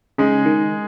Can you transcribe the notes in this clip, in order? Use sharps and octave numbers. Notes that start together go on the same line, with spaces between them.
C#3 G#3 D#4 G#4
D#3